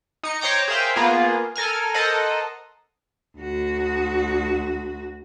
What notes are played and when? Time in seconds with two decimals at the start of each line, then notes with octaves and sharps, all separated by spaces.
0.23 D#4 C#7
0.41 C5 C#5 G5 A#5 D6
0.68 G#4 A#4 C5 E5 F5 G5
0.96 A#3 B3 F4 G#4
1.56 A4 A#4 G#5 F6
1.94 A4 A#4 C5 D#5 F#5
3.38 D2 F#4